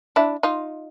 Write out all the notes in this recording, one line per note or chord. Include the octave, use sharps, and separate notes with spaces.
D4 E4
D#4 F4